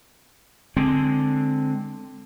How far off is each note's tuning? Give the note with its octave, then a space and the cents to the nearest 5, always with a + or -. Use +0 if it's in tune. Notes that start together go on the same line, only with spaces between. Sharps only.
D3 +0 G#3 +0 C4 +0